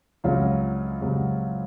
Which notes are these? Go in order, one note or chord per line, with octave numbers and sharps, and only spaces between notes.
C#2 C3 F#3 C#4 F4
C#2 C3 F#3